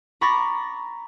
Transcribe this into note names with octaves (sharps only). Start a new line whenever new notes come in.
A#5 B5 C#6 D6 A6 A#6